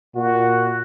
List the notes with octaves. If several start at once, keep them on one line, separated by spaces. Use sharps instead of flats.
A#2 F#4